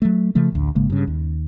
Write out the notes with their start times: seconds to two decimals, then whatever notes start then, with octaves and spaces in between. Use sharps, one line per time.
0.02 F#3 A3
0.35 C#3 F3 A3
0.52 A1 D2
0.75 G#1 C#3 G#3 A#3
0.90 G2 C#3
1.07 D#2